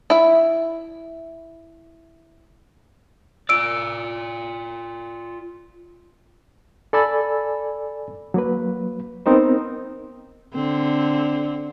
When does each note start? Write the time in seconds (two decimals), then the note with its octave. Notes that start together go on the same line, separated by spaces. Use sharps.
0.10 E4 E5
3.49 F4 D5 E6 D7
6.93 A4 D5 G#5 B5 E6 A6
8.34 F#3 A#3 B4
9.26 B3 C4 D#4 A#4 C5
10.54 D3 C4